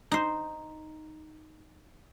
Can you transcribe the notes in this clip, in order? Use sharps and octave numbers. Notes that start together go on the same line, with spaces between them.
D#4 C5